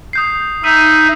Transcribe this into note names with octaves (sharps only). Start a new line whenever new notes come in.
D#6 G6 C7
D#4 E5 E6 D#7